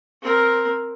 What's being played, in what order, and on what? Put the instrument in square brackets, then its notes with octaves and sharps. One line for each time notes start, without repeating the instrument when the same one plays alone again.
[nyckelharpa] C4 A#4